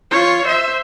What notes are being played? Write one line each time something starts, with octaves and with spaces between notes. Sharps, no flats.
F4 C#5
C5 E5